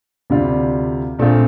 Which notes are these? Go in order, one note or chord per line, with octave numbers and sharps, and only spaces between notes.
D2 C3 G3 D4 F4
A#1 A#2 A3 C4 F4